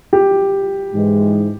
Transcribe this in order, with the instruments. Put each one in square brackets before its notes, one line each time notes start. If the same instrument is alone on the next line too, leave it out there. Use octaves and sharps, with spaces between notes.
[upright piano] G4
[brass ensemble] G#2 E3 G#3